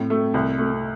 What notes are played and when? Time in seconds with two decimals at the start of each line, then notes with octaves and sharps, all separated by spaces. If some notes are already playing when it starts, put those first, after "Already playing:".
Already playing: A2 C4
0.10 A3
0.34 C2
0.58 A3